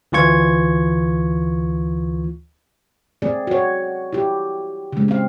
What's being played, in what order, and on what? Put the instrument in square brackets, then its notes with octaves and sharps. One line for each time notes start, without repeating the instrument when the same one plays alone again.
[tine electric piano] D2 E3 F4 C#6 G#6
[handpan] A3 C4 G#4 D5
F#4 C#5
E4 G4
C#3 G#3
C4 F5